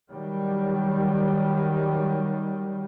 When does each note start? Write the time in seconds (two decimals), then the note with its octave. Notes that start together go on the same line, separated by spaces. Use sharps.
0.10 D#3 F#3 G3